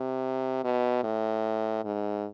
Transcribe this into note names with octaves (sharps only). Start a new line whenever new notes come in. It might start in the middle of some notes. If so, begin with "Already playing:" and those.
Already playing: C3
B2
A2
G#2